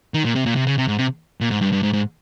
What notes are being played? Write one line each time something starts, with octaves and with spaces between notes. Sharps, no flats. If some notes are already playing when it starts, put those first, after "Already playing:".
D#3
A#2
C3
A#2
C3
C#3
C3
G#2
C3
A#2
G#2
G2
G2
G#2
G#2